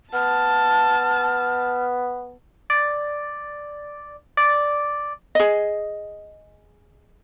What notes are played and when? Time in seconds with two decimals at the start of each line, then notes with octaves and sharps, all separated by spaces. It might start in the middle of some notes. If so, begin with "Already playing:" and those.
0.13 B3 A5 F6
2.70 D5
4.37 D5
5.35 G#4 D#5